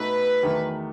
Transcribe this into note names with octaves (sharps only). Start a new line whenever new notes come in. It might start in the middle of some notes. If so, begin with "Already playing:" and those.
Already playing: B2 A3 D#4 A4 B4
E2 D#3 F#3 A3